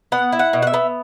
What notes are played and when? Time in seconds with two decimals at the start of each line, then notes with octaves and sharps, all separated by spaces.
0.12 B3 F#5
0.32 E4
0.39 F#5
0.53 B2
0.62 F#5
0.67 E5
0.74 B3